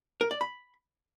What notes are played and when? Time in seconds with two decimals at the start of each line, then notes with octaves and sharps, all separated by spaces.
0.21 A#4
0.31 D5
0.41 B5